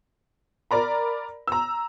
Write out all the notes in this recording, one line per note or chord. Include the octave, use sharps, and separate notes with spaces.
A#4 D5 A#5 B5
A#5 E6